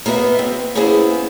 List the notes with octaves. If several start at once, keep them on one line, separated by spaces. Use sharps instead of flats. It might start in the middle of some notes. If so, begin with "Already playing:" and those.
A#3 B3 F#4 D#5 E5
C4
A#3 B3 C#4 E4 G#4 C5